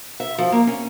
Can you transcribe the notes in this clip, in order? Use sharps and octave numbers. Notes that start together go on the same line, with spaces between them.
E5
F3
A#3
C#4